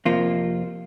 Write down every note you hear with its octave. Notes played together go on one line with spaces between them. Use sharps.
F2 C3 F3 A#3 F4